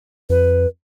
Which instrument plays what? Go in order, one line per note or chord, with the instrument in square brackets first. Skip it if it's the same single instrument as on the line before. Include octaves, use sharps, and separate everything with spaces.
[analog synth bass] F2 [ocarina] B4